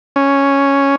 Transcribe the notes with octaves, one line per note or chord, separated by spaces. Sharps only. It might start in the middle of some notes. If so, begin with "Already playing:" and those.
C#4